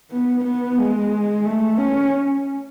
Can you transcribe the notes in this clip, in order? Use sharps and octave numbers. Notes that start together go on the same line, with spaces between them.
B3
B3
G#3
A3
C#4